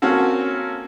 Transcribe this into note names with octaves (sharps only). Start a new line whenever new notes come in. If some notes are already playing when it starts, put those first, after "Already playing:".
A#3 C4 C#4 F#4 A4